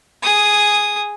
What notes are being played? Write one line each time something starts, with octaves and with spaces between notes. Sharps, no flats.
G#4 D#6